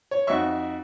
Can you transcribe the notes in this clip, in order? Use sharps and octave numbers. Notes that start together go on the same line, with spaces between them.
C#5
F2 D#4 F#4 E5 C#6